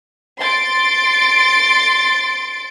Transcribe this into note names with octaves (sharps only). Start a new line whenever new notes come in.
C6 A6 D7